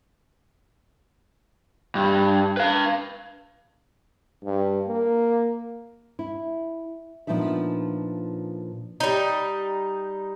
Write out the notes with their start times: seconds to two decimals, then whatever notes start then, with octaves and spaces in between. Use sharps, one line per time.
1.95 G2
2.57 B4 F5
4.44 G2
4.87 A#3
6.19 E4
7.27 A#2 F3 B3 D4 D#4 E5
9.00 G3 D#4